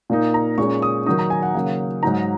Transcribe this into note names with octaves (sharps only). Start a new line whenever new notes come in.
A#2 A#3 D#4
A#5
A#2 G#3 C#4 C#6
D#6
D#3 F#3 D#4 D#6
A#5
G#5
F#5
C#3 F#3 A#3
G#2 F#3 D#4 A#5